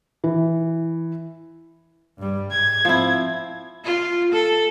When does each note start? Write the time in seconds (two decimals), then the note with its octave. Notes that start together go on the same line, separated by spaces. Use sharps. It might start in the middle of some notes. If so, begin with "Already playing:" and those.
0.24 E3
2.18 G2 G3
2.51 G#2 G#6
2.85 F3 C4 E4
3.85 F4
4.32 A4